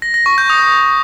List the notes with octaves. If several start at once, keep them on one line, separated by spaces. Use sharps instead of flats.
A#6
A#6
C#6
G6
D#6